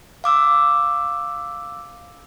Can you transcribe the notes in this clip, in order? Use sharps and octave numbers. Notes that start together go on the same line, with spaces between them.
F5 D6 E6